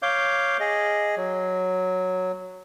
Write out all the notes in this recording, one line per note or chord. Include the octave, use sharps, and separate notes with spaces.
C#5 F5 D6 G6
G#4 D#5
F#3